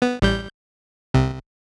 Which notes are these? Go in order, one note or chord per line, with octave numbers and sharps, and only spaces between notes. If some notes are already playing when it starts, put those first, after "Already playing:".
B3
A1 G3 G6
C2 C3